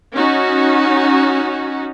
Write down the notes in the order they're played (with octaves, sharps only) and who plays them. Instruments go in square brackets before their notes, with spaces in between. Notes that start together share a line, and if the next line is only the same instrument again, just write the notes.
[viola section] C#4 D#4 F#4